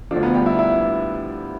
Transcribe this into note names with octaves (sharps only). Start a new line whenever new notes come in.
D2 D3 F3 D4 D5
B3 B4
G3 G4
E4
E4